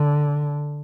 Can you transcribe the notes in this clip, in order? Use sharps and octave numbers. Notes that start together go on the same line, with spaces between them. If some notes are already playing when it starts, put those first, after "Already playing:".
Already playing: D3